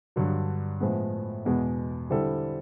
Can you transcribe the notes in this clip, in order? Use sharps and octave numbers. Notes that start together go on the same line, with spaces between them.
G2 D3 F#3
A2 F3 G#3 B3
E2 B2 G#3 B3
D3 G3 C4 E4 A4